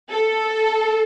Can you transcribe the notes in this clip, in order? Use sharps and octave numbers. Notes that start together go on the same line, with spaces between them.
A4